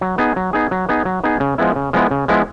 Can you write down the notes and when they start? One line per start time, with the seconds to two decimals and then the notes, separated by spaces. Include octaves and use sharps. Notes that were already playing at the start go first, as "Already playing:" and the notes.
0.01 F#3
0.18 B3 D#4 G#4
0.36 F#3
0.53 B3 D#4 G#4
0.71 F#3
0.89 B3 D#4 G#4
1.05 F#3
1.24 B3 D#4 G#4
1.40 C#3
1.58 F3 G#3 B3 E4
1.76 C#3
1.93 F3 G#3 B3 E4
2.11 C#3
2.28 F3 G#3 B3 E4